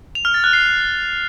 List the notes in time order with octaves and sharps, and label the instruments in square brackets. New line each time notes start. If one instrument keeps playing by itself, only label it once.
[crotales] F7
F6
A6
F#6
C7